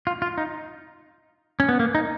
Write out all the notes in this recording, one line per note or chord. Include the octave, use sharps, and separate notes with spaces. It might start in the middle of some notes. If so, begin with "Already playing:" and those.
F4
F4
D#4
C#4
B3
A#3
D#4